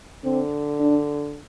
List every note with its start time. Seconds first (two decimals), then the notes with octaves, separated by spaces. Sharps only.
0.24 D3 C4
0.80 D4